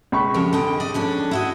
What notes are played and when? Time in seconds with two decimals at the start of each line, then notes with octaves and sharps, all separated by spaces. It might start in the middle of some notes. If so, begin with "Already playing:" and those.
0.12 C#2 B5 C#6
0.34 F2 C#3 G4
0.53 D3 D#5 G5
0.80 D5 D#5
0.94 F2 C#4 D4
1.31 E4 F#4 D#5